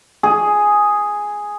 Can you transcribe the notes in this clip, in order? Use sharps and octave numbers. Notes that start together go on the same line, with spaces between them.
G#4